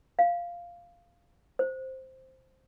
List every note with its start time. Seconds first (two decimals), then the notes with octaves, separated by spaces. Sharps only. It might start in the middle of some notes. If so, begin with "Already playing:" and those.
0.19 F5
1.59 C5